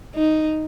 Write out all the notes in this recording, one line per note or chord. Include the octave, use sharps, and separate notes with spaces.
D#4